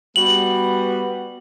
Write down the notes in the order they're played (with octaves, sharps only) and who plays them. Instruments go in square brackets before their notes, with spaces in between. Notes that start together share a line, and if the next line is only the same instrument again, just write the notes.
[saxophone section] G3 B3 F#4 [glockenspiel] F#7